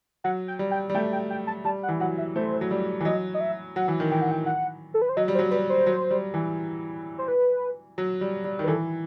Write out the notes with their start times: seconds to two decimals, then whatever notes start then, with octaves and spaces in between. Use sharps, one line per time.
0.24 F#3 F#5
0.48 G5
0.59 G3
0.71 G5
0.90 G3
0.95 A3 G5
1.12 G5
1.30 G5
1.47 A5
1.64 G3 A5
1.83 F#5
1.89 E3
2.00 F#3 F#5
2.18 E5
2.36 A3 C5
2.61 F#3
2.71 G3
3.01 E3
3.05 F#3 D#5
3.34 D#5
3.41 E5
3.76 F#3 F#5
3.88 E3
4.00 D#3
4.11 E3 G5
4.22 F#5
4.31 G5
4.46 F#5
4.94 A4
5.02 B4
5.09 C5
5.17 F#3 D#5
5.28 G3
5.35 C5
5.39 F#3
5.51 G3 B4
5.70 C5
5.86 F#3
6.11 G3
6.34 E3
7.18 C5
7.28 B4
7.98 F#3
8.21 G3
8.44 G3
8.59 D#3
8.64 B4
8.67 E3 A4